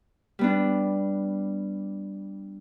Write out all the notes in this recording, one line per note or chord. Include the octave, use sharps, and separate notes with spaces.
G3 B3 D4